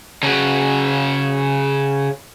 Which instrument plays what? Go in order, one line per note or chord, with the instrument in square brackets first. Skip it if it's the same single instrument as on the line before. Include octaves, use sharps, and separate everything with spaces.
[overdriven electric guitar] C#3 F#4